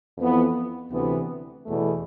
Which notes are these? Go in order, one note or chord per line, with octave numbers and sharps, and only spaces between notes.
F2 E3 B3
D2 C3 E3 B3
E2 B2 A3